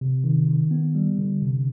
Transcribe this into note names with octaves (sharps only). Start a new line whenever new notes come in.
C3
D#3
D#3
B3
G3
D3
C3